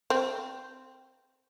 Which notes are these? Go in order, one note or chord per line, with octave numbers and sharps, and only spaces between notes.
C4